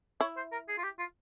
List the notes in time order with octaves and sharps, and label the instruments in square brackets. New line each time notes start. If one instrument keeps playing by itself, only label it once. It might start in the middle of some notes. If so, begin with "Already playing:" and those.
[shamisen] E4 [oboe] C#5
[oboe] C5
A#4
G#4
F4
G4
F4